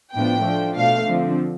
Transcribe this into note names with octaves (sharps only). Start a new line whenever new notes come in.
A2 F3 B3 D4 G5
F3 A3 D4
B2 A3 D4 F5
D3 F3 C4